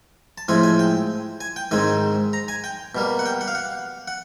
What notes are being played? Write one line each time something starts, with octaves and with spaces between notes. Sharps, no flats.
A5
A2 F3 G#3 C4 G#5
G#5
G5
G#5
G5
G#2 D#3 G#3 C4 G#5
A#5
G#5
G5
B2 G3 A#3
F#5
G5
F#5
F5
F#5
F#5